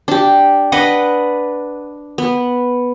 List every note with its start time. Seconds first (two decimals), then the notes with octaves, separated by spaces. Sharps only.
0.08 D4 G4
0.72 D4 B4 D#5 F#5
2.18 B3